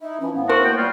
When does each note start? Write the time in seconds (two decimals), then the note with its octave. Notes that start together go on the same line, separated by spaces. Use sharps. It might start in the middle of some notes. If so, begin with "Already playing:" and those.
0.01 D#4 E4 E5
0.20 E3 F3 C#4
0.35 A2 B3 F5
0.49 F#4 A#4 C5
0.65 A#3 G5
0.77 G3 B3 F4 F#4